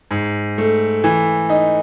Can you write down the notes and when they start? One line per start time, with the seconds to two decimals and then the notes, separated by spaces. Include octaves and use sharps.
0.11 G#2
0.58 A3
1.04 E3
1.50 D#4